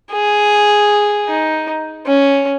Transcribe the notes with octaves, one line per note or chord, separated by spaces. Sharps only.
G#4
D#4
C#4